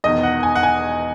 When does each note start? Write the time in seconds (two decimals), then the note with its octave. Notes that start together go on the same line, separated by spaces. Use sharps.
0.04 E1 E2 D#3 D#5
0.23 F#5
0.43 G#5
0.55 F#5
0.63 G#5